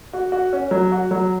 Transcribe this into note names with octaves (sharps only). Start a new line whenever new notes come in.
F#4
F#4
C#4
F#3
F#4
F#3